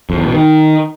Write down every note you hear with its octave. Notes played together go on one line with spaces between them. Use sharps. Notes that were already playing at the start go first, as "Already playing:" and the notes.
F2
E2
B2
D#3